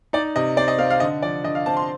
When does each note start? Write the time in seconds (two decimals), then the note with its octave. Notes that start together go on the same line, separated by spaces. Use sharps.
0.13 D#4 D5
0.36 C3 D#5
0.57 C4 D5
0.68 D#5
0.78 C4 F5
0.90 F5
1.00 D3 D#5
1.22 F3 D5
1.44 D3 D#5
1.55 F5
1.66 C4 A5
1.77 C6